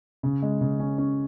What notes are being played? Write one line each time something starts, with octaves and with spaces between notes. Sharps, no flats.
C#3
G#3
C#3
C#4
C#4